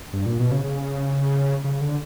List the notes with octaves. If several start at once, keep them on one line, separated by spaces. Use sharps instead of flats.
G2
A#2
B2
C#3
C#3
C#3
D3